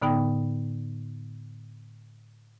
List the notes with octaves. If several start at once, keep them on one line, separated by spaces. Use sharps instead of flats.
A2 D3 B3 D#4 G5